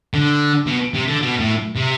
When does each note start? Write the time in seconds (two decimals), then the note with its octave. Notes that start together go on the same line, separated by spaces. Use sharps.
0.14 D3
0.67 B2
0.94 C3
1.08 D3
1.22 B2
1.40 A2
1.76 C3